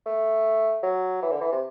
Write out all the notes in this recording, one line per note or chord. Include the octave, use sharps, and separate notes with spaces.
A3
F#3
E3
D3
E3
C3